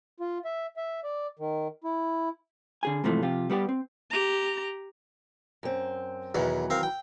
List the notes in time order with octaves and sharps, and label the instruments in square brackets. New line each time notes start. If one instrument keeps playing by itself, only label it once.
[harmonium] F4
E5
E5
D5
D#3
E4
[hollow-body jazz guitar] D3 G#4 G#5
G#2 C3 E3 F3 A3
C3 F3 F4 G4
G3 B3 G4 D5
C4
[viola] G4 A#5
[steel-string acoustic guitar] F#2 C4
[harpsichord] E2 B2 [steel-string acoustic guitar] D#3 E3 F#3
[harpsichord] C4 A#4 F5
G5